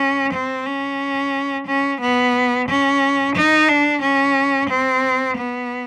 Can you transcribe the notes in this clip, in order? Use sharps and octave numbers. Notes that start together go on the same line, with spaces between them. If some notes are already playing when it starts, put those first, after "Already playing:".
Already playing: C#4
C4
C#4
C#4
B3
C#4
D#4
D4
C#4
C4
B3